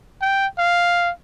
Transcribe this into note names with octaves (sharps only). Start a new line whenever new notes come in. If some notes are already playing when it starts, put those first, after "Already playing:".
G5
F5